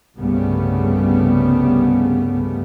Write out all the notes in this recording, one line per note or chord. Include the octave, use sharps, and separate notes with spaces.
C2 G2 C#3 G3 A3 B3